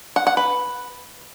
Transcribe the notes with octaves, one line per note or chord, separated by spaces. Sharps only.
F#5
F#5
B4